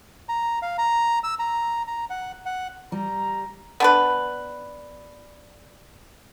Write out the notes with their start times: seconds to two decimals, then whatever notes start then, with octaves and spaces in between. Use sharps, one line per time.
0.29 A#5
0.62 F5
0.78 A#5
1.24 E6
1.39 A#5
1.87 A#5
2.10 F#5
2.46 F#5
2.92 G3 A#5
3.80 B3 D4 B4